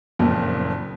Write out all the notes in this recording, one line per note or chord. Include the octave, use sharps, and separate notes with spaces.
F#1 F2 A#2